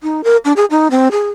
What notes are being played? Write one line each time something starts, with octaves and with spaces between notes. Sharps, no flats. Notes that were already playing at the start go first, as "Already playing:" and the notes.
D#4
A#4
D4
G#4
D#4
C4
G#4